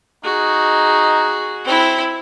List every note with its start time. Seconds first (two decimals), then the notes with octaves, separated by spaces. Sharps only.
0.24 D#4 F#4 G#4
1.65 C4 E4